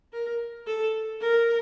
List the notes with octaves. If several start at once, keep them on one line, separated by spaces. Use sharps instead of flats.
A#4
A4
A#4